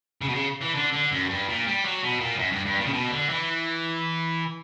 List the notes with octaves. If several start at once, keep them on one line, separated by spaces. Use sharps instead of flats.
C#3
B2
C#3
E3
D3
D3
F#2
G2
A#2
G3
F#3
B2
A#2
G2
F#2
G2
G2
A#2
C#3
B2
D3
E3